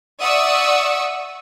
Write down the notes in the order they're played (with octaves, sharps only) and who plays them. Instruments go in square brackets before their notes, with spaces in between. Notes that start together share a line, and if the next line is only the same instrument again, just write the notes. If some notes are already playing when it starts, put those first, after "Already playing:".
[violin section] D5 E5 F#5 C#6 D#6 E6